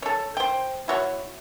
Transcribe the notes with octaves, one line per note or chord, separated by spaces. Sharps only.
A4 C#5
C5 G5
E4 F#4 C#5